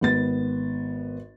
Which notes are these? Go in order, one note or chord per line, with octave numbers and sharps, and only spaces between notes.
G#1 B3 A6